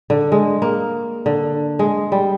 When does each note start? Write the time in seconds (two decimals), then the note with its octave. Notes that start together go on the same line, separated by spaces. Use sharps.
0.10 D3
0.32 G#3
0.62 A#3
1.26 D3
1.79 G#3
2.12 G3